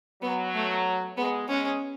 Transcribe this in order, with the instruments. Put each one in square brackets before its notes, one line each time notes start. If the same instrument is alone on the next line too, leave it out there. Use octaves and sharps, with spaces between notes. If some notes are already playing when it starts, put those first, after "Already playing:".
[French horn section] F#3 [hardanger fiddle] B3
[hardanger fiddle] A3
[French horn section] G#3 [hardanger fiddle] B3
[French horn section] G#3 [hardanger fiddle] C#4